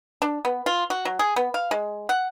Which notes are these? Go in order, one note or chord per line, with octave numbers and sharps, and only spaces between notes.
D4
B3
F4
F#4
F#3
G#4
B3
F5
G#3
F#5